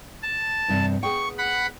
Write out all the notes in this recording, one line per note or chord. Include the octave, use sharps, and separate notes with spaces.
A5
E2 G2 C3
B3 G#4 G5 C#6
F#5 B5